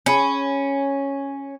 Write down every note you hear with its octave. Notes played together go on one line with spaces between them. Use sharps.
C#4 G#4 B5